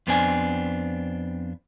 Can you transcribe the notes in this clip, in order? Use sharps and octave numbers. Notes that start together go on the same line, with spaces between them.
F2 B3 C4 D4 G#5